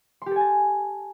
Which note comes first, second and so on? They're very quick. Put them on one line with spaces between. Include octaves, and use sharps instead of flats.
C6 G4 A4 G#5 A5